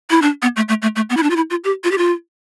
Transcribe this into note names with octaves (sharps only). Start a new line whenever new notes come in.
E4
D4
B3
A3
A3
A3
A3
B3
E4
D4
F4
E4
F4
G4
F4
G4
F4